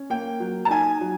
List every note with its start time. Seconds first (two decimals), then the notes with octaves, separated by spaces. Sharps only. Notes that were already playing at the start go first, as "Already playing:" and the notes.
Already playing: C#4
0.10 A#3 G5
0.40 F#3
0.65 A5
0.70 D#4 G#5
1.01 F#3